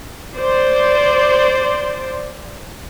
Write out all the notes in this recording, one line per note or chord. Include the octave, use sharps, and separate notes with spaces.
C5 D5